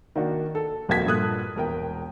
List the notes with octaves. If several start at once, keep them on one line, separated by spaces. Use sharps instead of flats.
D#3 A#3 D4 F#4
A4
D#1 F2 A#3 F#4 G#6 B6
G2 A#2 A4 D#6 F#6
E1 A#4 G5